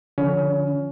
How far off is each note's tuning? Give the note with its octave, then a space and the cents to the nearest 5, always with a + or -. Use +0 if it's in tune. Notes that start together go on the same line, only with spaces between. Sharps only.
D3 +0 F3 +0 C#4 +25